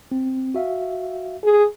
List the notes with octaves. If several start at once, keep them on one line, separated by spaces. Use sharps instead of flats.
C4
F#4 E5 F5
G#4